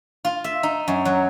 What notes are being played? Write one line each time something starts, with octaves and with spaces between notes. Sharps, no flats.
F4
E5
D#4
F#2
F#3